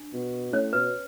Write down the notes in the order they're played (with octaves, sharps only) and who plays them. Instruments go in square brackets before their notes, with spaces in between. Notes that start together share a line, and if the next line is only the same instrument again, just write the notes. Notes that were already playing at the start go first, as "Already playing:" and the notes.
Already playing: [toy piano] D4
[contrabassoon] B2
[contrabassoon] A2 [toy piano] C#4 C#5
[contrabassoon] B2 [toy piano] B4